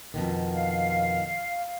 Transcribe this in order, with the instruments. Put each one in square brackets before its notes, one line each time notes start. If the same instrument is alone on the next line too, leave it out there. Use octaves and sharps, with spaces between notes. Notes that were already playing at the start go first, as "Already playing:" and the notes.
[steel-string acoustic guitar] F2 B2 D#3
[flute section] F5